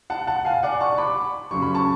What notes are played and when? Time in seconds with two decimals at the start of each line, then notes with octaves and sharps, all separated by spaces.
0.10 F#5 A5
0.27 F#5 A5
0.45 F5 G#5
0.63 D5 F#5
0.80 A5 C#6
0.98 B5 D6
1.51 F#2 C#3 F#3 C#6
1.62 B5
1.75 A5 C#6